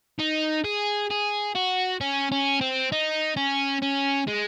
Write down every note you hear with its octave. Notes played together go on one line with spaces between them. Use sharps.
D#4
G#4
G#4
F#4
C#4
C#4
C4
D#4
C#4
C#4
G#3